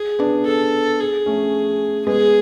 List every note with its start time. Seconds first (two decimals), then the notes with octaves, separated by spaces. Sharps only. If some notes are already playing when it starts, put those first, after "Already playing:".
Already playing: G#4
0.19 B3 D4
0.46 A4
1.00 G#4
1.26 A3 C#4
2.07 G#3 B3 G#4